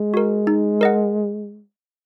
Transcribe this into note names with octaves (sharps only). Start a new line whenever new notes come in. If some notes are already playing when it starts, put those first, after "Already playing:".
Already playing: G#3
F#4 A#4
D#4
A#4 D#5 F#5